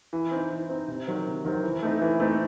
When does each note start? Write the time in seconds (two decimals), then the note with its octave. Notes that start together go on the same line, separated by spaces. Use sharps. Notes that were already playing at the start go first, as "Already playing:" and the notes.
0.13 E3
0.31 C4 D#4
0.51 E3
0.69 C4 D#4
0.88 C3
1.07 D#3 F#3 C4
1.26 C3
1.45 D#3 F#3 C4
1.63 E3
1.82 A3 C4 D#4 A4
2.01 E3
2.20 A3 C4 D#4 A4